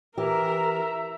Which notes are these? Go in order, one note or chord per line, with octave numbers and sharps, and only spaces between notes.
E3 G4 A#4 E5 A#5